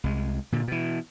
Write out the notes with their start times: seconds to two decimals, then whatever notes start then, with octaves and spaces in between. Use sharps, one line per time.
0.04 C2 G#3
0.52 A#2 D3
0.68 B2 E3